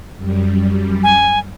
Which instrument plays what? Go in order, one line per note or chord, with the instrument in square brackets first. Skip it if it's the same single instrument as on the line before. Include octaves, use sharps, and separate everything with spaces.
[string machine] F#2 G3
[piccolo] G#5